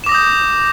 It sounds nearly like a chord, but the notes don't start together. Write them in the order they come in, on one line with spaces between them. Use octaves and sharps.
E7 D6 A#6 D#6 G6